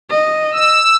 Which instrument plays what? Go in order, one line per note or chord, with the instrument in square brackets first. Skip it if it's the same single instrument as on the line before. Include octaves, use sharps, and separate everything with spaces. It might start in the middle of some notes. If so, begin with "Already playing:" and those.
[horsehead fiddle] D#5
[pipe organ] E6